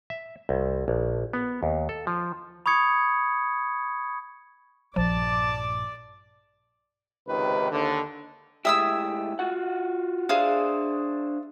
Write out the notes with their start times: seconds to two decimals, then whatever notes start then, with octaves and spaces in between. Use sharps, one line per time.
0.10 E5
0.49 C2
0.88 A#1
1.33 B3
1.63 D#2
1.89 A4
2.07 F3
2.66 B5 C#6 D#6 G#6 C#7
4.96 A#1 G2 F3 D5 A5 D6
7.28 C#2 G#2 C3 D#3 B4
7.71 D#2 D3
8.65 A2 G#3 G4 E5 D#6 E6
9.39 F4 F#4 F#5
10.29 D4 G#4 C5 E5 F5